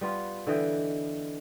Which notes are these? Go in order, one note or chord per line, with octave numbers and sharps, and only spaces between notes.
G3 B3 F4
D3 E3 D#5 G5